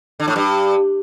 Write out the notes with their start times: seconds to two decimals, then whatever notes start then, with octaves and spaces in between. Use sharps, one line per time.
0.20 D3
0.28 A2
0.36 G2